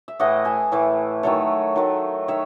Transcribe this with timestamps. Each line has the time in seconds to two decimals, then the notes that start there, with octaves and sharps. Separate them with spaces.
0.08 E5
0.19 A2 E3 A3 D#5 F#5
0.45 E5 G#5
0.72 A2 E3 A3
1.23 D#3 F#3 A3 A4 C#5
1.76 D#3 F#3 A3
2.28 D#3 C#5 E5